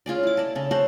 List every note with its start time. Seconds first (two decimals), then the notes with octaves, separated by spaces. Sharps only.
0.06 C#4 F4 G#4 D5
0.23 E4 D6
0.37 A4 D5
0.55 C#3 A4
0.71 A4 C5 C#5 F#5